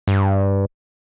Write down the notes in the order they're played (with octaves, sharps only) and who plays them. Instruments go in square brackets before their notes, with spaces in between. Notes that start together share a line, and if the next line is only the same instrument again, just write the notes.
[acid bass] G2